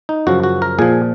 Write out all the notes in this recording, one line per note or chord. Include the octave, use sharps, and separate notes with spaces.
D#4
F#2 C#3 F3 F#4
F#4
A#4
A#2 F3 G#4